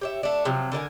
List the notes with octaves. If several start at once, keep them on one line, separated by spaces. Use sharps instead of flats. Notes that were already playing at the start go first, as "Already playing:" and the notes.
G4 C#5 E5
A3 D4
C3 F3 F#3
D3 A#4 D#5 G#5